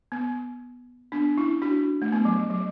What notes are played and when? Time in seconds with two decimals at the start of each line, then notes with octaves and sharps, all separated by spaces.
0.12 B3
1.12 B3 D4
1.37 C#4 E4
1.62 D4 F#4
2.02 A3
2.12 B3
2.25 F#3
2.50 F#3